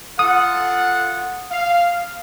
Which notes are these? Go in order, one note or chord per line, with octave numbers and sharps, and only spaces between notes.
F4 A4 F#5 D#6
F5